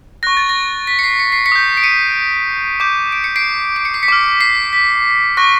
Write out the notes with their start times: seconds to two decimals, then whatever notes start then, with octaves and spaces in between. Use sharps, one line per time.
0.23 C#6 F#6 A#6
0.37 A6
0.49 A#6
0.87 B6
0.99 C#7
1.03 C7
1.20 C#7
1.32 C7
1.46 B6 C#7
1.52 D#6 G6
1.77 D7
1.83 C#7 D#7
2.80 D6 G6
3.12 D7
3.24 C#7
3.36 C7 D7
3.76 D7
3.85 C#7
3.94 C7
4.03 B6 C#7
4.08 D6 F6
4.41 C7
4.73 B6
5.37 C#6 F#6 A#6